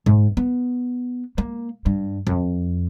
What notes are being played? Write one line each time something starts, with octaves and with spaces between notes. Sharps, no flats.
G#2
B3
A#3
G2
F2